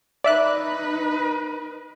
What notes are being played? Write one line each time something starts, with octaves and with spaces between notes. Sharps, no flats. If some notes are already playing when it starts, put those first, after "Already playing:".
D#4 B4 D5 E5 F#6